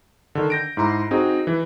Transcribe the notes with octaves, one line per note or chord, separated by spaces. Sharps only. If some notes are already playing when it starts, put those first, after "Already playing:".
D3 D#3
G6 A#6 D7
G#2 E4 A#5 C6
C4 D#4 F#4 G#4
E3